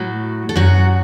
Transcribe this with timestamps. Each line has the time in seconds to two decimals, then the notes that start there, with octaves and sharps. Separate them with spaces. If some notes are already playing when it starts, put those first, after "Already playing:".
Already playing: A2 F#3 F#4
0.49 A4
0.56 F#2 F#3 F#4